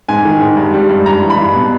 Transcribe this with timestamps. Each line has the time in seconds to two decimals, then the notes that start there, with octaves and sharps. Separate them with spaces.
0.08 G#2 G#5
0.25 D#3
0.41 G#2
0.57 G2
0.74 G3
0.89 G2
1.06 G2 A#5
1.21 E3
1.30 B5
1.38 G2
1.54 B2